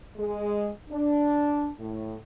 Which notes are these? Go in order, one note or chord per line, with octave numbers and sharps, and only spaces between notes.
G#3
D4
A2